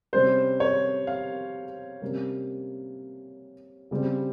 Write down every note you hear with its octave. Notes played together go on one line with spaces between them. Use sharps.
C3 G3 C#4 C5
C#5
F5
C3 G3 A#3 C#4
C#3 G3 C4